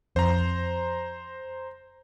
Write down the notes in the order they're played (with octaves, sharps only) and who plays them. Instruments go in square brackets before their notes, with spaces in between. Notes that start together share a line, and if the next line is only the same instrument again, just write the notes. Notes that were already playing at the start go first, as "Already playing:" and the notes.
[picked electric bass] F2 [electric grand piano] C5 A#5